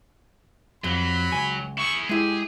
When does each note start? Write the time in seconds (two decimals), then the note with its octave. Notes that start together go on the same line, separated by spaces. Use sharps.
0.84 F2 F#3 B5
1.32 C#2 G#5
1.78 E4 G#4 C#6
2.09 G#3 E4 G4 G#4